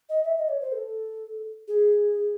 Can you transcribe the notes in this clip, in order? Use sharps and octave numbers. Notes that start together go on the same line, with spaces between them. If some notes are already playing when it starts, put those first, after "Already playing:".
D#5
E5
D#5
C#5
C5
A4
G#4